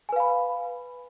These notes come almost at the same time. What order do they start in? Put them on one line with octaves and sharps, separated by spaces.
G#5 B4 F5 B5